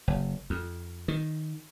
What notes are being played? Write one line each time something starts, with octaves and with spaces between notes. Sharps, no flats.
F#1
F2
D#3